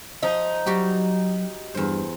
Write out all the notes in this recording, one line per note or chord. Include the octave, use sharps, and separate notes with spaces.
F3 D#4
F#3 G3 F#4 G4
E2 G2 C5